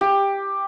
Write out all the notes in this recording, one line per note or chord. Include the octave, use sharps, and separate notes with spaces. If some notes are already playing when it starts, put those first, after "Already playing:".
G4